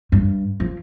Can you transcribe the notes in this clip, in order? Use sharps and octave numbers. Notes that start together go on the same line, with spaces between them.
G2
F3